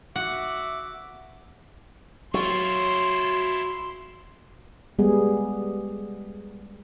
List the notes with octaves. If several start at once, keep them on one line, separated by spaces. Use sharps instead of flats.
F#4 E5 F#5 D6
F#3 E4 F4 C6 C#6
G3 G#3 B3 G#4